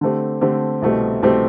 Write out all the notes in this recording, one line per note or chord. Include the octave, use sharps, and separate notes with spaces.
D3 A3 C4 G4
D3 A3 C4 G4
C2 B2 A3 C4 G4
C2 B2 A3 C4 G4